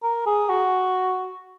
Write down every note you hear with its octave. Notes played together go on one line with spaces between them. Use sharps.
A#4
G#4
F#4